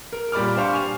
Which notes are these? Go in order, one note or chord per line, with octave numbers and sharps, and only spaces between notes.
A#4
A#2 G3 D5 B5 D6 F6
D4 G4 C5 F5 C#6
G#5 F7